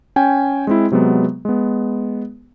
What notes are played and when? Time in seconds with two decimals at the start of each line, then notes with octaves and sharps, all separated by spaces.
0.16 C#4 G5 G#5
0.67 G#3 C4 E4
0.92 C3 F#3 G#3 B3
1.45 G#3 B3